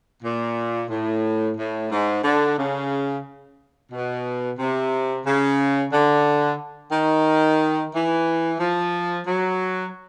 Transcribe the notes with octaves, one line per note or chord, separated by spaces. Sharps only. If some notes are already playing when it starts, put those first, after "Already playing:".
A#2
A2
A2
G#2
D3
C#3
B2
C3
C#3
D3
D#3
E3
F3
F#3